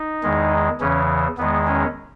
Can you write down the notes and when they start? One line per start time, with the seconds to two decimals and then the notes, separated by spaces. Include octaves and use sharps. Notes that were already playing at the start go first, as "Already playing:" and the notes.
Already playing: D#4
0.23 E2 D#3 G#3
0.81 E2 C#3 E3 C#4
1.38 E2 D#3 G#3 B3
1.67 C#4